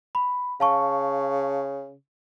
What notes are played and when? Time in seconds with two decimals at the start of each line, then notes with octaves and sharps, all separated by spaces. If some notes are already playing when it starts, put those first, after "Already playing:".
0.15 B5
0.60 C#3 F5 A5 C#6